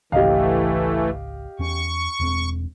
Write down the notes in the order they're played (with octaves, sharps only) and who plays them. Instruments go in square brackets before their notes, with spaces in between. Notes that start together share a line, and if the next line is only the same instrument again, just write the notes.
[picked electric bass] G#1 C#2 D4 [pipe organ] E3 A3 [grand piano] G4 D#5 F5
[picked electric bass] E2 C#4 [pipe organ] C#6
[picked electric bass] E1 E2 C4